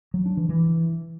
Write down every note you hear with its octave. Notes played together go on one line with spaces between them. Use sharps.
F#3
D4
E3
E3